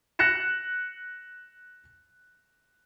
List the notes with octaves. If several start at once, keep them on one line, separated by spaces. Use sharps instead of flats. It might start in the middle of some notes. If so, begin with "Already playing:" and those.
F#6 A#6 C#7 E7